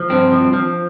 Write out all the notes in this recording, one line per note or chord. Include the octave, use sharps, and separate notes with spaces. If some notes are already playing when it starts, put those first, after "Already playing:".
Already playing: F3
G2 C4
F3
F3